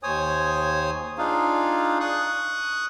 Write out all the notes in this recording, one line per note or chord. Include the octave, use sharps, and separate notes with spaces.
D#2 C5 C#5 G#5 D#6
D4 D#4 F4 G#4 F5
C#6 D#6 F#6